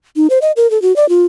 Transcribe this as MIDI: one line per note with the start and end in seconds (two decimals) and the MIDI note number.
0.16 0.27 63
0.30 0.39 72
0.42 0.52 75
0.57 0.69 70
0.71 0.80 69
0.82 0.95 66
0.96 1.08 74
1.09 1.26 65